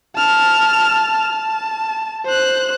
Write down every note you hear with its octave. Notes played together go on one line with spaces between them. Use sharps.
A5 F6
A5
C5 F#6